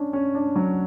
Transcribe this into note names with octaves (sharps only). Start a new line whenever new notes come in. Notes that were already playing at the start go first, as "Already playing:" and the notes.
Already playing: C#4 D4
C#4
D4
F#3